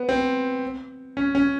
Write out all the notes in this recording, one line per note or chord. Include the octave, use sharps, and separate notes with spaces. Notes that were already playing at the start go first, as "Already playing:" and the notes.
Already playing: B3
C4
C#4
C#4